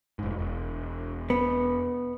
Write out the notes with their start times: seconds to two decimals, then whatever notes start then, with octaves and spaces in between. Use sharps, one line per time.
0.19 F1 G#2
0.39 E1
1.30 B3